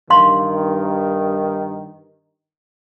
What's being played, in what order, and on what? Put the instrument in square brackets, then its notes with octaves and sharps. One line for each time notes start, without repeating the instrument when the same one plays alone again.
[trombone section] G2 D#3 [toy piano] F5 C6